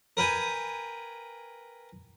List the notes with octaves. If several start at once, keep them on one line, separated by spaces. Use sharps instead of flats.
A#4 B4 G5 G#5